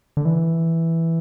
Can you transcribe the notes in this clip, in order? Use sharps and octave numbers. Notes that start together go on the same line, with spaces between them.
D3
E3